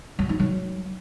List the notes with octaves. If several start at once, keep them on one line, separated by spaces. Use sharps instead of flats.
F#3
D#4
F#3